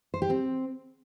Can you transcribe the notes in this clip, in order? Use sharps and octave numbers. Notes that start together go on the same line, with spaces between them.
C5
G4
C4